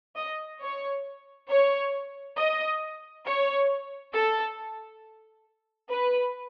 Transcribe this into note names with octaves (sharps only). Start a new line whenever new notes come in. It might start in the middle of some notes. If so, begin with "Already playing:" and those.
D#5
C#5
C#5
D#5
C#5
A4
B4